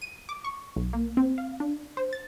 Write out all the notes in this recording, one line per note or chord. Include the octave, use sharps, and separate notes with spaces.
D#7
D6
C#6
B1
A#3
C4
F5
D4
C5
A6